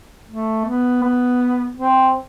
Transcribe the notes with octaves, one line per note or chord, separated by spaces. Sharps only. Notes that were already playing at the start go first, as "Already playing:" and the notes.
A3
B3
B3
C4